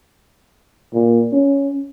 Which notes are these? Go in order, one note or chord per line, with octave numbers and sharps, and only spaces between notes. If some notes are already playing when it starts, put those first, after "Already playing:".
A#2
C#4